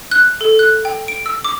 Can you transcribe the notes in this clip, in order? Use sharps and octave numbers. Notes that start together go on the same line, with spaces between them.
F#6
A4
F#6
G5
D7
E6
D6